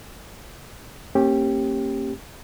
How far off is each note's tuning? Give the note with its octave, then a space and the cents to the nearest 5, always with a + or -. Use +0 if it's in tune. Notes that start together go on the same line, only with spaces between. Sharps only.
A#3 -15 C#4 -35 G4 +0